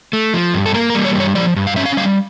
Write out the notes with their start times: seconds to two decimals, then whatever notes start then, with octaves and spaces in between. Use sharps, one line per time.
0.13 A3
0.34 F3
0.54 G2
0.66 A4
0.74 A#3 A#4
0.90 A#4
0.95 G3
1.05 C#5
1.15 G2 C#5
1.35 F3 D5
1.56 G2
1.67 F5
1.76 C#4 E5
1.86 F5
1.97 G3 F5